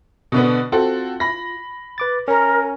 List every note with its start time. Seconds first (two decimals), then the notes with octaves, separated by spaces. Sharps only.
0.32 B2 D3 B3
0.72 C4 F4 F#4 A4
1.20 B5 A#6
1.98 B4 D6 A6
2.28 C#4 A#4